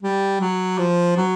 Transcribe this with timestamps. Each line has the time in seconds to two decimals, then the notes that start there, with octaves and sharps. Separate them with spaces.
0.03 G3
0.41 F#3
0.79 F3
1.17 F#3